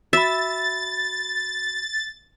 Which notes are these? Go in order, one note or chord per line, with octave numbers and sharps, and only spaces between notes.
F#4 E5 B5 A6